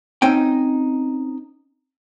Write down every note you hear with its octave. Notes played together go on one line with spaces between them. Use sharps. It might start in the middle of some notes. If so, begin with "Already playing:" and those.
C4 C#4 D#4 G5